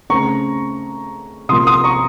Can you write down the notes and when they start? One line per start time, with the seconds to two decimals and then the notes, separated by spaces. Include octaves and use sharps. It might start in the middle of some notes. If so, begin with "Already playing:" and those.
0.10 C#3 A3 C4 A#5 C#6
1.49 C3 F3 A#3 C6 D#6
1.67 C6 D#6
1.84 A#5 C#6